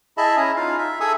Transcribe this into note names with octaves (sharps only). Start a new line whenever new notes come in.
E4 G#4 D#5 E5 A5 B5
C#4 E4 G#5 A#5
D#4 F4 F5
E5
G#4 A4 E5 G#5 D#6 E6